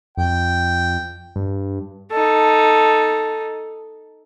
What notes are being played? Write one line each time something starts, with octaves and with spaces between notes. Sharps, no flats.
F2 G5
G2
D#4 A4